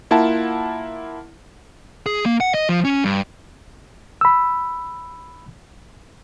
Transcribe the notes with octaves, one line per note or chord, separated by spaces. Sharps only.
A#3 E4 F4 F#5 A5
G#4
A#3
F#5
D#5
F3
C#4
G2
B5 E6